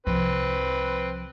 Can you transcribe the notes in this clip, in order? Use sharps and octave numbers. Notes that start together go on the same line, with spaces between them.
C2 F3 C4 B4